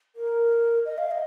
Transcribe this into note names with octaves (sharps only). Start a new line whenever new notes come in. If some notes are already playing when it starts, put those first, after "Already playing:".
A#4
D#5
F5
D#5